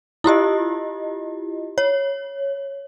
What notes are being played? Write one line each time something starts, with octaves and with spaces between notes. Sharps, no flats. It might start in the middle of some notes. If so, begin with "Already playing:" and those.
E4 F4 G4 D#5
C#5